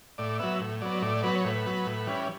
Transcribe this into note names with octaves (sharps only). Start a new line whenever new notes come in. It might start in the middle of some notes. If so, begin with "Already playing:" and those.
A2 D5
F#3 B3 E5
A2
F#3 B3 D5
A2 D5
F#3 B3 B4
C#5
A2 B4
F#3 B3
A2
E3 G3 C#4